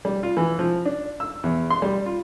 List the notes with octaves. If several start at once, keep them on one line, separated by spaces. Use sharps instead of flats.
G3
F4
E3
F3
D4
E6
E2
C6
G3
F4